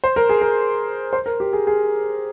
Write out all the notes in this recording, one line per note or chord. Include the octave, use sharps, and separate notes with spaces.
C5
A#4
G#4
A#4
C5
A#4
G4
G#4
G#4